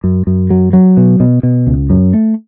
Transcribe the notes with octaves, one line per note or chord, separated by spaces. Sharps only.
F#2
F#2
F#3
F#3
B2
B2
B2
C#2
F#2
A3